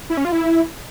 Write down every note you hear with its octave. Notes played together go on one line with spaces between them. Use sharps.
E4
C#4
F4
E4